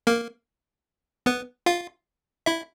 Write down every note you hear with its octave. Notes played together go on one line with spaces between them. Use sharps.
A#3 A#4
B3 B4
F4 F5
E4 E5